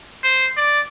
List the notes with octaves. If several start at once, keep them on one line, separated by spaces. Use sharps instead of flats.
C5
D5